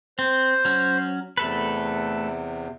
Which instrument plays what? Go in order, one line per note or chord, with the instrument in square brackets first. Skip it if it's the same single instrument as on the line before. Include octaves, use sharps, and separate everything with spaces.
[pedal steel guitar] C4 [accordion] C5
[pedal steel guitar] F#3 C#4
[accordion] E2 C3 [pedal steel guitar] A3 A4 B4